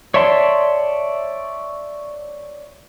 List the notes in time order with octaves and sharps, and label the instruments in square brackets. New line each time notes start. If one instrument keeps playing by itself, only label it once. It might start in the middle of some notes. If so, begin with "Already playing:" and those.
[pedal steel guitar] C#5 D5 E5 A5 C6